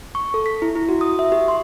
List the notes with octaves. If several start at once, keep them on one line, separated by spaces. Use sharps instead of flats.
C#6
A4
B6
E4
E4
F#4
D#6
E5
G4
C6